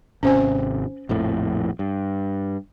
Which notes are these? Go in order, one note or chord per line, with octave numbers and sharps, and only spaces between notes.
G#1 C3 C#4 C5 G#5
A#1 F2 A2
G2